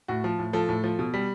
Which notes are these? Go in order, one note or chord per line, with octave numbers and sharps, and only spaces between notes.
A2 F#4
F3
A2
F3 A4
A2
F3
B2
G3